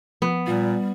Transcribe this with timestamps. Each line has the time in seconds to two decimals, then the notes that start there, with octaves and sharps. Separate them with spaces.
0.22 F3 B3
0.48 A#2 G3 F4